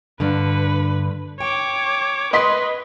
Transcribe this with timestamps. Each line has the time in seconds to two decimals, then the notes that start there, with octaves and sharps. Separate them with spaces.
0.20 G2 D3 B4
1.40 C#5 G5 D6
2.33 B4 D#5 C6 B6